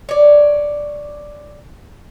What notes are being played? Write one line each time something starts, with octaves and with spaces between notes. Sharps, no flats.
C#5 D5